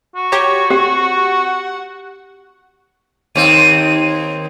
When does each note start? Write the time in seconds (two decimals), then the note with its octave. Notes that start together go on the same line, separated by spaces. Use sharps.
0.16 F#4
0.32 G4 C#5 A#5
0.71 C4 G4 F#5
3.35 D#2 C4 D#7